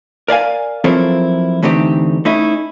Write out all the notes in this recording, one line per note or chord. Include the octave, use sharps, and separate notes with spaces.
A#4 D5 F5 G#5
F3 F#3 C4 E4 A4 A#4
D3 E3 A3 C4 D#4 G4
A3 C#4 D#4 E4